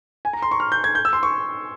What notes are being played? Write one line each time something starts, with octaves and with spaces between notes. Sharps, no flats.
G#5
A#5
C6
C#6
F6
G6
G#6
G6
E6
C6
C#6